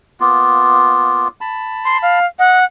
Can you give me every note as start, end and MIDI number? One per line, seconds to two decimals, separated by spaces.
0.20 1.28 58
0.20 1.28 59
0.20 1.28 65
1.41 2.19 81
1.41 2.19 83
1.85 1.98 84
2.02 2.26 77
2.39 2.59 75
2.39 2.64 78